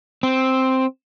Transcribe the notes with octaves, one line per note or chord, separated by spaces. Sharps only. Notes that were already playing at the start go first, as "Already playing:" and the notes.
C4